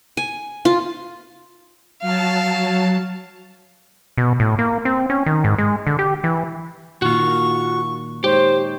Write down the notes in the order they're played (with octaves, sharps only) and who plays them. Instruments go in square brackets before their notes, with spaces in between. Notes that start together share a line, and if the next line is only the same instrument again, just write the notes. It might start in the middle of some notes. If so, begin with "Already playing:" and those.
[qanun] G#5
F4
[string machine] F#3 A5 [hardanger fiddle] F5
[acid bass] B2
A2
A#3
C4
C#4
D#3
G#2
G#3
D3
G4
E3
[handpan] A#2 D#3 A#3 [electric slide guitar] F4 F#4 [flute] C#6
[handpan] G#3 D#4 C#5 [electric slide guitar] G4 [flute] C5